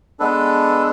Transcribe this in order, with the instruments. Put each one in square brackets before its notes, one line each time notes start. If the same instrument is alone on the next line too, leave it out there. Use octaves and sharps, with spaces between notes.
[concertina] G#3 B3 D4 A4 B4